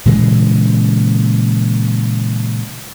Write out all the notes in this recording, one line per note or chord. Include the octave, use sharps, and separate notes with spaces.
A#2 C#3 E3 G#3